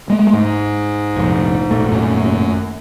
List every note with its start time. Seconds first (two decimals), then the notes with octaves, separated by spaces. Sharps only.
0.10 G#3 A3
0.33 G#2
1.16 F1 A#1
1.71 G#1 A#2 A3
1.91 F#2